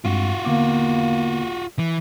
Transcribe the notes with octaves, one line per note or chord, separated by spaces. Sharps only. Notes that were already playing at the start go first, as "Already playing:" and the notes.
G2 G#3 C4 F4 F#4
D3 A#3 B3 D6
E3